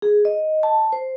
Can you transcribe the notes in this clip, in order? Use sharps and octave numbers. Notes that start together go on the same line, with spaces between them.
G#4
D#5
A5
C5